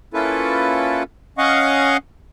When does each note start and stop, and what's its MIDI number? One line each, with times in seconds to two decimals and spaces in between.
0.14 1.03 58
0.14 1.03 61
0.14 1.03 64
0.14 1.03 65
0.14 1.03 69
0.14 1.03 71
1.38 1.97 61
1.38 1.97 75
1.38 1.97 77
1.38 1.97 78
1.38 1.97 85